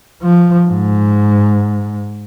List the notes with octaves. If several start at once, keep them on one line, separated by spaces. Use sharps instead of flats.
F3
G#2